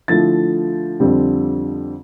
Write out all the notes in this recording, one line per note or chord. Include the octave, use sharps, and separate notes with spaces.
D3 F3 A3 E4 A6
F2 D3 G3 C4 F4